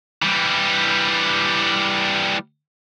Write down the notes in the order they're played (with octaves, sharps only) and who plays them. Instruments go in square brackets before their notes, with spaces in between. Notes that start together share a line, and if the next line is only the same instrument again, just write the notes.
[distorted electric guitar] E3 G3